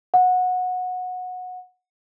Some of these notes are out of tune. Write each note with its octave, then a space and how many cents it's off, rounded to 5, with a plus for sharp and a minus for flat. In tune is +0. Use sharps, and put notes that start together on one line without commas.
F#5 -20